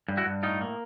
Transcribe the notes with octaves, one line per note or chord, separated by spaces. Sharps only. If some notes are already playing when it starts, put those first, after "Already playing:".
G2
E4 F#4
G2
A2 D#4 F4
A#3